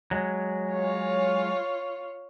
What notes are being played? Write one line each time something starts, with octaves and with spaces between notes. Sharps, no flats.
F#3 G#3
F4 C#5